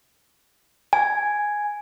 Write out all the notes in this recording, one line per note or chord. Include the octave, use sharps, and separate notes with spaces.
G#5